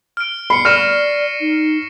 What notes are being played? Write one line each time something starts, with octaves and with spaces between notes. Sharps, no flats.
F6 D7
B5 C7 C#7
D5 C#6 F6 A#6 E7
D#4